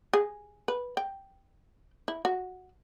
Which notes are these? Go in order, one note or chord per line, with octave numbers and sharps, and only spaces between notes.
G#4
B4
G5
E4
F#4